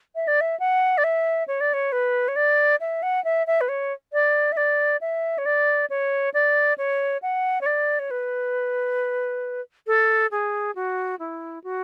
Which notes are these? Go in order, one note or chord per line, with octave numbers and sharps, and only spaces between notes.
E5
D5
E5
F#5
D5
E5
C#5
D5
C#5
B4
C#5
D5
E5
F#5
E5
E5
B4
C#5
D5
E5
D5
E5
C#5
D5
C#5
D5
C#5
F#5
C#5
D5
C#5
B4
A4
G#4
F#4
E4
F#4